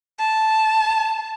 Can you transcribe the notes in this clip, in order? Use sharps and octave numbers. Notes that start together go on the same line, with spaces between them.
A5